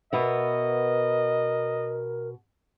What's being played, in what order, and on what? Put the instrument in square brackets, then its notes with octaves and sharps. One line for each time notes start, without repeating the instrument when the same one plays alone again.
[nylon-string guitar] B2 B3 E5 [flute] A#4 [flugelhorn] D#5